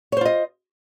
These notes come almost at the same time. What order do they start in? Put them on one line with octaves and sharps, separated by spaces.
C#5 C5 F4 D#5